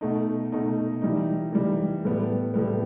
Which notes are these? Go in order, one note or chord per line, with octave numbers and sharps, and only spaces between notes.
B2 A3 D#4
B2 A3 D#4
E3 G3 D#4
E3 G3 D#4
A2 G3 B3
A2 G3 B3